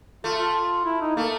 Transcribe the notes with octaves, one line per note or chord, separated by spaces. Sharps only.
A3 F4
F4
E4
D#4
A3 A#3